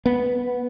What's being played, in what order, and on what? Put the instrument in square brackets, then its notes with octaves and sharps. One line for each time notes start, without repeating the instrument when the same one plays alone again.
[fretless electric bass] B3